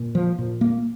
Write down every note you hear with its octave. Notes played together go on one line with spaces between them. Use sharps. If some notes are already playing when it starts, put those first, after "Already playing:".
Already playing: A#2
F3
A#2
A#3